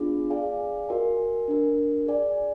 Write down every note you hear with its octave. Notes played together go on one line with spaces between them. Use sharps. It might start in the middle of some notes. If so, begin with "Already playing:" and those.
Already playing: B3 D4 F4 G#4
G#4 D5 F5 G#5
F#4 A#4 D#5 G#5
D4 F#4 A#4
G#4 D5 G#5